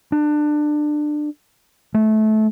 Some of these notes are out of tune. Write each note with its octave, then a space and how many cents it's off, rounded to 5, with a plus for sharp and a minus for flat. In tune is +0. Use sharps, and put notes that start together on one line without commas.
D4 +25
A3 -20